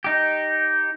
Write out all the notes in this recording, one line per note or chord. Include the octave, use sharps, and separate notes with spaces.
D#4 G4